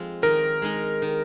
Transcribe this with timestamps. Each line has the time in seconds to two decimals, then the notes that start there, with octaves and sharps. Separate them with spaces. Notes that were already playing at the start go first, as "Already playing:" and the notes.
Already playing: F3 G#3 C4 F4
0.22 D#3 A#4
0.62 G#3 D#4 G#4
1.02 D#3